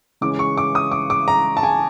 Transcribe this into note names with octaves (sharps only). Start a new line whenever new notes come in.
C#3 E3 G#3 C#4 D6
C#6
D6
D#6
D6
D6
A#5
A5
G#5